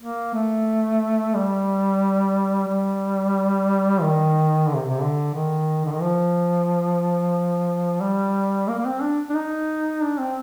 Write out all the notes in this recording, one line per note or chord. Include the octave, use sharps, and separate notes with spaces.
A#3
A3
G3
G3
D#3
D3
C3
C3
D3
D#3
D3
D#3
F3
G3
A#3
A#3
C4
D4
D4
D#4
D4
C4